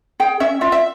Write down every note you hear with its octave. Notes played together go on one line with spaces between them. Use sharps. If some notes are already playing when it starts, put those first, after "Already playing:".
G#4 G5
C#4 E5
F4 E5
E5